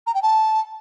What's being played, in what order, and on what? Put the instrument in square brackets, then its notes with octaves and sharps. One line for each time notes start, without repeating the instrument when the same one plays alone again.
[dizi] A#5
G5
A5